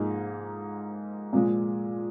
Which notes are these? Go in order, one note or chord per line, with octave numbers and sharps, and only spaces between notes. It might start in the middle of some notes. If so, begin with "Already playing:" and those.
Already playing: G#2 F3 A#3 D#4 G#4
A#2 F3 G#3